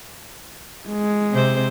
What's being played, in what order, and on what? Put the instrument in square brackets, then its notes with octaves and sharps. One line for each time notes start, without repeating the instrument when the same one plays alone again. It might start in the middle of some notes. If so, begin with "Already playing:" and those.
[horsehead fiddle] G#3
[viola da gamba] C3 C4 C5